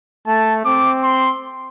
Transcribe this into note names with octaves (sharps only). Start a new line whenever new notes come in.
A3 A5
C4 D6
C6